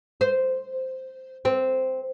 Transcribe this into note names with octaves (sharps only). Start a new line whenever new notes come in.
C5
C4